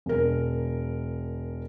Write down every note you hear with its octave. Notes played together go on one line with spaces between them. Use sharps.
E1 A#4